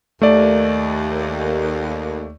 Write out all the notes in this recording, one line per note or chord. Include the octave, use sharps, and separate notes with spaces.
D#2 A3 D5